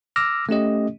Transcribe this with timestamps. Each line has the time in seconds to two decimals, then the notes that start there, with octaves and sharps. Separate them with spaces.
0.16 D6 E6 F6 A#6
0.49 A3 C#4 G4 D#5